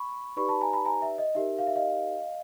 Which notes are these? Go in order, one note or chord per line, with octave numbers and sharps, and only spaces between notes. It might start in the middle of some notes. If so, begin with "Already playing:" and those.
Already playing: B5 C#6
D#4 G4 B4 D5 B5 C#6
A5 B5
G#5 A#5
A5 B5
G#5 A#5
E5
D#5
D#4 G4 A#4 E5
F5
E5
D#5 F5